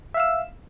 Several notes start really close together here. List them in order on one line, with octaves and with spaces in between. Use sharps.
E5 F5 E6